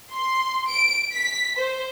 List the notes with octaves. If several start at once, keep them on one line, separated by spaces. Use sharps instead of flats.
C6
D7
B6
C5